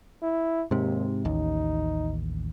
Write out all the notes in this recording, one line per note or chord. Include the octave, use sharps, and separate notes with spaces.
E4
D#2 G#2 C3
A1 D#2 D#4